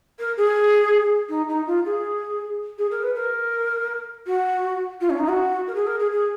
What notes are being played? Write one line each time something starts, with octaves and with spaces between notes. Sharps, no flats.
A#4
G#4
D#4
D#4
F4
G#4
G#4
A#4
B4
A#4
F#4
F4
C#4
D#4
F#4
A#4
G#4
A#4
G#4
G#4